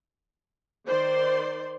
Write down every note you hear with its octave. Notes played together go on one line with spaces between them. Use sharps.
D#3 C5 D5 C6